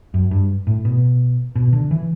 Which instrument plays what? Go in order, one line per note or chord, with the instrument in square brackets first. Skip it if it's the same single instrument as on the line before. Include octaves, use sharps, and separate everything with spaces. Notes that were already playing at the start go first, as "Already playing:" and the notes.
[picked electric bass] F#2
G2
A2
B2
B2
D3
E3